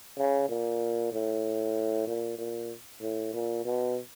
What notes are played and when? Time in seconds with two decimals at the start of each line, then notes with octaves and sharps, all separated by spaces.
0.18 C#3
0.49 A#2
1.13 A2
2.07 A#2
2.38 A#2
3.02 A2
3.34 A#2
3.65 B2